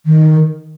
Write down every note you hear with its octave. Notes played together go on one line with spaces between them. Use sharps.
D#3